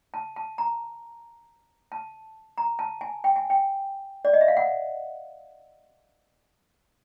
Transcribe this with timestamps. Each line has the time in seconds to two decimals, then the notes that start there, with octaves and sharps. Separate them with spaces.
0.14 A5
0.36 A5
0.58 A#5
1.92 A5
2.58 A#5
2.79 A5
3.01 G#5
3.24 G5
3.36 G#5
3.50 G5
4.25 D5
4.33 D#5
4.41 E5
4.48 F5
4.57 F#5